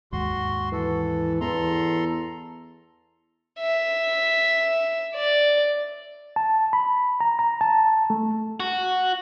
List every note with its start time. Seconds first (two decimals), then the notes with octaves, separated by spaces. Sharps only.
0.12 D#2 G#2 F#4 C6
0.72 E3 A4
1.41 E2 A4 A#5 C6
3.60 E5
5.14 D5
6.36 A5
6.73 B5
7.20 A#5
7.39 A#5
7.61 A5
8.10 A3
8.60 F#4